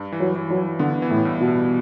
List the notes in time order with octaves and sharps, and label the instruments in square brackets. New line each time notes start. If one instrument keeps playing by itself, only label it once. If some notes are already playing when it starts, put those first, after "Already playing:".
Already playing: [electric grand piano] G2
E3
[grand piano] F#3
[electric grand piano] E3
[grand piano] F#3
[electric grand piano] E3
[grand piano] D3 [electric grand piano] B3
[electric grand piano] E3
[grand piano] A2
[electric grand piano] G2
[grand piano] B2
[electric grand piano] G2